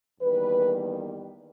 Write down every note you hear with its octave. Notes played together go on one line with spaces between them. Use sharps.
E2 D#3 G3 A#3 B4